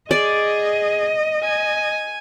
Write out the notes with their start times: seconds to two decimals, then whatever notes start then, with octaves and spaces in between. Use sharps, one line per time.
0.11 G#4 D5 D#5
1.43 G#5